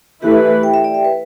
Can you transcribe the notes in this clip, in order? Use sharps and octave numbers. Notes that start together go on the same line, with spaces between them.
E3 A3 E4 G4 B4
G5
E5
D5
E5
B4